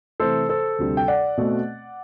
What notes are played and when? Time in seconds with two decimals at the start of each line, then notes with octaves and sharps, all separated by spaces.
0.20 C3 E3 A3 A4 C5
0.49 A4 C5
0.79 D2 C3 G3 D4
0.97 G5
1.08 D5 F#5
1.38 B2 A3 C4